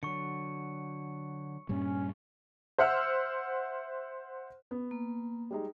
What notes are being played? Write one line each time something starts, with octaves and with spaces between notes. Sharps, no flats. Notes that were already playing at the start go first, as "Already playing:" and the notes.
D3 F#3 C#6 C#7
G2 A#2 G3 C#4
C5 E5 F#5 E6 F6
B3
A#3
G3 G#3 D#4